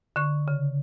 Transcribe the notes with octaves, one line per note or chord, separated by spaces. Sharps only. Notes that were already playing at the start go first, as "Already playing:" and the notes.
D3 C#6
C#3